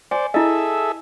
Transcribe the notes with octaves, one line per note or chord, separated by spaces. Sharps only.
C5 D5 G#5
E4 G#4 A4 D#5 E5